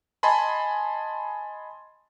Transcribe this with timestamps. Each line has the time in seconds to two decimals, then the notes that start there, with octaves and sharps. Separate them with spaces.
0.23 D#5 G#5 A5 B5 C6